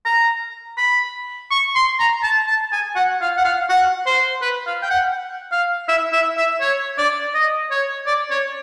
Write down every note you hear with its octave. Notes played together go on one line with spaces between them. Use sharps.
A#5
B5
C#6
C6
A#5
A5
A5
G#5
F#5
F5
F#5
F5
F#5
C5
B4
F5
G5
F#5
F5
E5
E5
E5
C#5
D5
D#5
C#5
D5
C#5